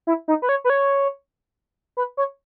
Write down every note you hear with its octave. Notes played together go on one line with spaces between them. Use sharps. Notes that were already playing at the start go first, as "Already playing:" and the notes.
E4
D#4
B4
C#5
B4
C#5
B4
C#5